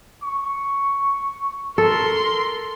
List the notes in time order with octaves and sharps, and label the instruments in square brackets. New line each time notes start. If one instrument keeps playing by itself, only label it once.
[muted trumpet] C#6
[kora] A4 [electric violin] A#4 C6